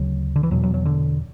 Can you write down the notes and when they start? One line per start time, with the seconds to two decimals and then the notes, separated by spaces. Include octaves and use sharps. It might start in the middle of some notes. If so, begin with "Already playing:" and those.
Already playing: D2 C#3 F#3
0.36 D3
0.43 E3
0.51 E2 B2 F#3
0.63 F#3
0.74 F#3
0.86 D3